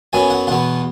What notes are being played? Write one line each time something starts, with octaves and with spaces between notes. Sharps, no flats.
F#2 F#3 B3 G#5
F#5
E2 B2 B3 F#5